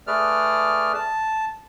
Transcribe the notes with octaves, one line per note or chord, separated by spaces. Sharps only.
A3 G#4 B4 D5 F6
A5